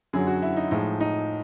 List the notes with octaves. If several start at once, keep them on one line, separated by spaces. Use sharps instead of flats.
F#2 D3 F#3 G#4
F#4
E4
D#4
A2 F3 G#3 D#4
D#4